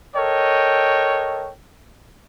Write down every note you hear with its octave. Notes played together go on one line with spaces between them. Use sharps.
A4 A#4 C#5 D#5 G5